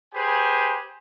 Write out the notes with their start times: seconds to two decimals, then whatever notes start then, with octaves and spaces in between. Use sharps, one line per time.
0.14 G4 G#4 B4 C5 G#5